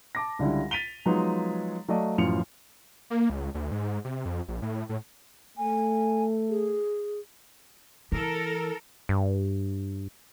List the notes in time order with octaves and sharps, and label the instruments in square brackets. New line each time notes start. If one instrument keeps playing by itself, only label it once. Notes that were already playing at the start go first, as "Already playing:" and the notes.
[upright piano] A5 D6 A#6
C#2 D3 G3 E4
A6 B6 D#7 F7 G7
F3 F#3 G#3 B3 D#4
F#3 A3 D5 D#5 F5 A5
F#2 A2 E3 F3 C#7 F7
[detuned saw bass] A#3
C#2
D2
G#2
C3
F2
A#1
A2
A2
[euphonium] A3 [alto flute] G#5
[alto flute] G#4
[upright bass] E3 [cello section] A4 A#4
[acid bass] G2